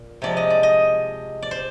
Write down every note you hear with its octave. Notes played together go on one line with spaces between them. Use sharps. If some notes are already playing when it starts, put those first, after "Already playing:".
Already playing: A#2
C3 F3 G#3 D5
D#5
D5
D#5
D5
C5